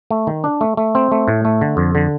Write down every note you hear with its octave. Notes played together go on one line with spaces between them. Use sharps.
A3
D#3
D4
A3
A3
C4
A3
A2
A3
D3
F2
D3